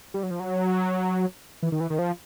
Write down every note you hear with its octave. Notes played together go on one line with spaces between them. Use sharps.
G3
F#3
F3
F#3
E3
D#3
E3
D#3
F3